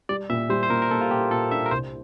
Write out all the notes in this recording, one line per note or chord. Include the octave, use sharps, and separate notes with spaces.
G3 D5
A#2 E5
G3 C5
C5
A#2 A#4
A#4
A#2 A4
F4
A#2 G4
A#2 A4
D4 E5
A#4
C2 C5